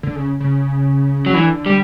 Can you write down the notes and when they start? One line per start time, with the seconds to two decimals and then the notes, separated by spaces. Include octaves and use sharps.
0.03 D3
0.15 C#3
0.41 C#3
1.26 F#3
1.33 D3 E3
1.66 G3